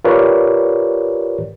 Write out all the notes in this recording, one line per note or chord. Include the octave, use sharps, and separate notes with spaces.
F4 G4 A#4 B4 C#5 D5